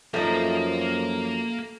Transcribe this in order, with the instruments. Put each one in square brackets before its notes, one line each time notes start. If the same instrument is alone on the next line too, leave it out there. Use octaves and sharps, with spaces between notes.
[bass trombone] F#2 [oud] F3 D#4 [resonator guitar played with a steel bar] A3 [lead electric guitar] A#3 A#4